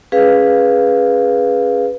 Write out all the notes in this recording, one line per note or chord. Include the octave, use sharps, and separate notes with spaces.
C#4 G#4 B4 F5